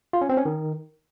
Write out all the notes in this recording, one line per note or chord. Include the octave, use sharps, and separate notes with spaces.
F4
C#4
C4
C#4
D#3